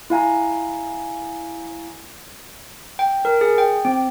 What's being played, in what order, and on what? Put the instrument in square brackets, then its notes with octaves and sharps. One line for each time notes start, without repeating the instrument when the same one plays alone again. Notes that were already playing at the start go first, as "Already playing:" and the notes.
[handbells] E4 F5 G#5 A#5
G5
A#4
G#4
G5
C4